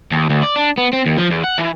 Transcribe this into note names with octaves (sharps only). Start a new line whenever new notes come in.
D#2
D2
D5
D4
B3
C4
D#2
F3
E2
F#5
E3